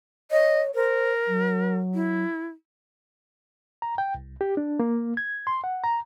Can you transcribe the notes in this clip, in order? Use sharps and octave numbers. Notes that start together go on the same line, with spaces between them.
C#5 D#5
A#4 C5
F#3
E4
A#5
G5
C2
G4
D4
A#3
G#6
C6
F#5
A#5